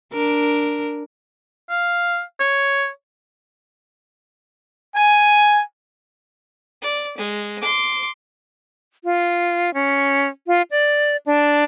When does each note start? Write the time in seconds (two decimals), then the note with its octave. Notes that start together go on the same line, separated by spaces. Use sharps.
0.13 D4 A#4
1.70 F5
2.40 C#5
4.95 G#5
6.82 D5
7.18 G#3
7.61 C6 D6
9.04 F4
9.74 C#4
10.47 F4
10.71 D5
11.26 D4